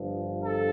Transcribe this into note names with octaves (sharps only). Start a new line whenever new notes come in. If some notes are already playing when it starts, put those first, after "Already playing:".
Already playing: G1 G2 F3
A4